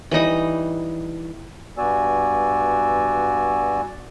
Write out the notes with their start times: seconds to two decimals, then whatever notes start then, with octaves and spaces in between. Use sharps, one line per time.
0.11 E3 G3 D#4 D#5
1.78 G2 B3 F#4 D5 G#5 E6